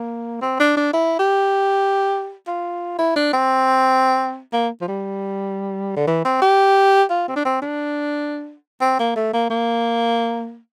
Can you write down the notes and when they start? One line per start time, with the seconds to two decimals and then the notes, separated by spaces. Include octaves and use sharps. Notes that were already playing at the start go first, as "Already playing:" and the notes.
Already playing: A#3
0.42 C4
0.60 D4
0.77 D4
0.93 E4
1.19 G4
2.47 F4
2.99 E4
3.16 D4
3.33 C4
4.53 A#3
4.81 F3
4.88 G3
5.96 D3
6.07 E3
6.25 C4
6.42 G4
7.10 F4
7.28 C4
7.36 D4
7.45 C4
7.62 D4
8.81 C4
8.99 A#3
9.16 A3
9.33 A#3
9.50 A#3